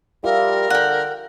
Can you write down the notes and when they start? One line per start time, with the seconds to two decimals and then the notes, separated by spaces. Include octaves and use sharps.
0.24 G3 F4 G4 A#4 E5
0.70 D3 F#5 G5